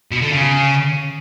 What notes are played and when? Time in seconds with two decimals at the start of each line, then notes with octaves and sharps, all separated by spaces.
0.11 B2
0.21 D3
0.31 C#3